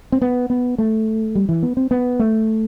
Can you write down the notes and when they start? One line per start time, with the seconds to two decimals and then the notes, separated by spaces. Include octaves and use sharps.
0.12 C4
0.22 B3
0.50 B3
0.78 A3
1.35 G3
1.49 E3
1.63 B3
1.77 C4
1.91 B3
2.19 A3